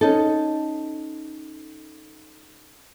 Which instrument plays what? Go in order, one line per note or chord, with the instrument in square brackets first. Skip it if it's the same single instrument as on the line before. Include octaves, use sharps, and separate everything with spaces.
[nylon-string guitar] C#4 D#4 A4